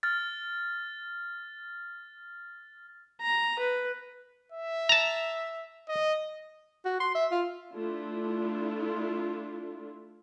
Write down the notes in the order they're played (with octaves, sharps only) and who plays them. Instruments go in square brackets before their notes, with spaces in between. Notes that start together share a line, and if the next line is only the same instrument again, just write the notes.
[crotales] F6 A6
[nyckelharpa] A#5
B4
[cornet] E5
[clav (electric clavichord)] A5 A#5
[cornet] D#5
[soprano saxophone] F#4
C6
E5
F4
[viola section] A3 D4 E4 F4